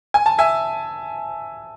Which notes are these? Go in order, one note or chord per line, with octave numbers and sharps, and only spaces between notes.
G#5
A5
E5 G#5